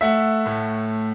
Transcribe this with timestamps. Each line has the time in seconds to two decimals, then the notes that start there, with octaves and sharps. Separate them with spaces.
0.01 A3 E5 F#5
0.46 A2